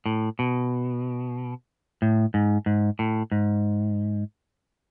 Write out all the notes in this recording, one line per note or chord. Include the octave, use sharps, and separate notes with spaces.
A2
B2
A2
G#2
G#2
A2
G#2